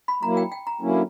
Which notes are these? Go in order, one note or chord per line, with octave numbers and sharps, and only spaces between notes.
B5
F#3 A#3 E4 A#5
G5
G5
A#5
D3 F#3 A#3 C#4 E4